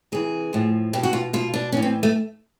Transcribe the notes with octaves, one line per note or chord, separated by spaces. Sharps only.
C3 E3 G#4
A2 F3
B2 G4
F#4
F4
B2 F4
D4
A2 E3 C#4
C4
A3